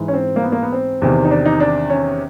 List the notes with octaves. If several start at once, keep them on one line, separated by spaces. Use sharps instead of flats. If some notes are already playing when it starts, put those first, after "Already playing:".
Already playing: G#2 E3
C#4
C4
A#3
B3
A#3
B3
C4
E2 C3 D#3
D#4
D4
D#4
D4
C#4